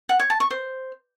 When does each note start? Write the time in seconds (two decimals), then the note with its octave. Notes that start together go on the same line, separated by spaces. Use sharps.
0.09 F#5
0.20 C#5
0.30 A5
0.40 C#6
0.51 C5